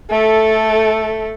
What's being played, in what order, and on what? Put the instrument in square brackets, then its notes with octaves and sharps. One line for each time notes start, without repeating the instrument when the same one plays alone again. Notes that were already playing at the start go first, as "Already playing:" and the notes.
[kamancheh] A3 A4